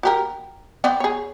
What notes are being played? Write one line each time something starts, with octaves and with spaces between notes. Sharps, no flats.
F#4 G4 A#4
B3 C4 D5
G#4 C#5